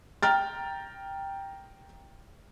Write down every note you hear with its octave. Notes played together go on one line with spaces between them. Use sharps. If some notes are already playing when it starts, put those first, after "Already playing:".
G5 A#5 F6 A6